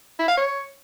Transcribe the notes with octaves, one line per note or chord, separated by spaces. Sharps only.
E4
F5
C#5